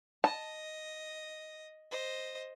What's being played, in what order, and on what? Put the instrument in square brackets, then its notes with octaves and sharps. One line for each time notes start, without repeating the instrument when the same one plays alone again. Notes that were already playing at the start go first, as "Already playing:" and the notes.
[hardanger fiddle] D#5 [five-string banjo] A5
[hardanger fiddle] C5 D#5